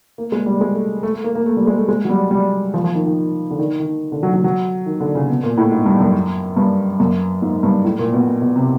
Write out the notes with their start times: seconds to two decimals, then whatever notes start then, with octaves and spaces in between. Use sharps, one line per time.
0.18 A#3
0.32 G#3
0.46 G3
0.61 G#3
0.75 A3
1.03 A3
1.14 A3
1.24 A#3
1.35 A#3
1.46 A3
1.57 G3
1.67 G#3
1.78 A3
1.88 G#3
2.05 F#3
2.09 G3
2.31 G3
2.74 F3
2.84 F3
2.95 D#3
3.06 D#3
3.51 D3
3.59 D#3
3.80 D#3
4.12 D3
4.23 F#3
4.34 F#3
4.44 F#3
4.86 D#3
5.00 D3
5.15 C#3
5.29 B2
5.43 A#2
5.58 A2
5.72 G#2
5.86 G2
6.00 F#2
6.57 G2
7.00 F#2
7.42 G#2
7.63 G2
7.84 A2
7.99 A#2
8.13 B2
8.41 B2
8.56 C3